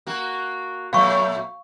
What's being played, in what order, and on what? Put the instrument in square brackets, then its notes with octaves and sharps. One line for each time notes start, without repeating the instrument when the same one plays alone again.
[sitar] A#3 F#4
[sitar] A#2 F#3 A3 [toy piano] F5 C#6